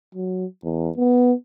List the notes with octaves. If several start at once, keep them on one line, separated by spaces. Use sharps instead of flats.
F#3
E2
B3